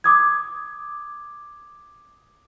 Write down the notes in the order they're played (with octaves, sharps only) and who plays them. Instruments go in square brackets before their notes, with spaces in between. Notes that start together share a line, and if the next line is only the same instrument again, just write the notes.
[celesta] D6 D#6 G#6